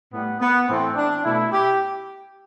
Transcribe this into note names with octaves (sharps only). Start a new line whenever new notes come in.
A2 G3 B3
B3
A2 E3 A3 C4
D4
B2 A3 E4
G4